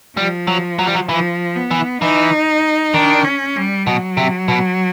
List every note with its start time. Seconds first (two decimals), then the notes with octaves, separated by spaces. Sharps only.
0.17 F3 G3
0.48 F#3
0.79 F#3
0.87 G3
0.94 F#3
1.09 E3 F3
1.56 B3
1.71 E3
2.02 E3 D#4
2.94 D#3 D4
3.25 C#4
3.56 G3
3.87 B2 F#3
4.17 C3
4.48 B2